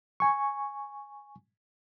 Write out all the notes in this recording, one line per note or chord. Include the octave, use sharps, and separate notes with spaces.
G#5 C#6